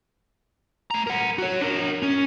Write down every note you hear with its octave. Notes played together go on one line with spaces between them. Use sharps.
A3 A#5
A#4 F#5
F#4 C#5
D4 A#4
C#4